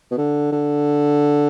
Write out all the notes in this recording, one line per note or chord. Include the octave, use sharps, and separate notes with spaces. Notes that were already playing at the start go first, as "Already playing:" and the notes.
B2
D3
D3